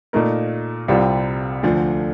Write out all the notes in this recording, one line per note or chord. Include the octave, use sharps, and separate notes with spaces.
A#2 A3 D#4 A#4
C2 C3 G3 C4 F4
D2 D3 F3